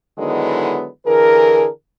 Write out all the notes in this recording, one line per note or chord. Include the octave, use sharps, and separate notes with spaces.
D3 D#3 F#3 G#3 B3 E4
D3 E3 G#4 A#4